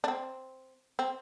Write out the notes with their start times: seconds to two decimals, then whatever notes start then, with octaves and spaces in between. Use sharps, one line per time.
0.04 D4
0.08 C4
0.99 C4